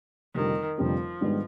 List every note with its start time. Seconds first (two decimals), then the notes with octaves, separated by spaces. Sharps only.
0.35 F1 F2 D3 D#3 G3 C4
0.78 F1 F2 D3 F3 G3 C4
1.21 G#2 D#3 G3 B3 D4